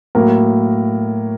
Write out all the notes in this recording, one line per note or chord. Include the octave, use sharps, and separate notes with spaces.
A2 F#3 A#3 A#4